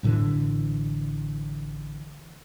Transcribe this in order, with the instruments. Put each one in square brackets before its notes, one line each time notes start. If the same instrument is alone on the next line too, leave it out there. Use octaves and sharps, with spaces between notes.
[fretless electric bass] A1 A2 D3 E3